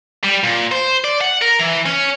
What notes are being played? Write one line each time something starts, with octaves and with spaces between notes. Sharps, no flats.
G3
A#2
C5
D5
F#5
A#4
E3
C#4